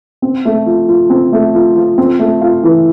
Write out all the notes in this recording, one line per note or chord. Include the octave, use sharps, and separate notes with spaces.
C4
A3
F3
F3
C4
A3
F3
F3
C4
A3
F4
E3